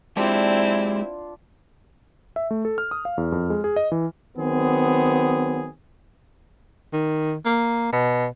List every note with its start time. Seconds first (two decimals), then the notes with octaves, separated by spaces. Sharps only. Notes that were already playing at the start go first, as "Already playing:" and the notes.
0.17 G#3 C4 D4 E4 F4 G4 C5
2.36 E5
2.51 A3
2.65 A4
2.78 F6
2.91 D#6
3.05 F5
3.18 E2
3.32 F2
3.50 G#3
3.64 G#4
3.76 D#5
3.92 E3
4.37 D#3 F#3 B3 C4 G#4
6.93 D#3
7.45 A#3
7.92 B2